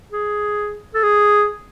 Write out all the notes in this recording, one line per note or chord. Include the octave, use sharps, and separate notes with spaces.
G#4
A4
G#4